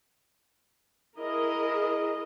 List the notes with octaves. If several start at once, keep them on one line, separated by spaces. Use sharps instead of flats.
E4 G#4 A#4 D#5